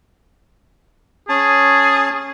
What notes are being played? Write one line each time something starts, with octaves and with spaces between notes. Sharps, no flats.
C#4 G#4 A5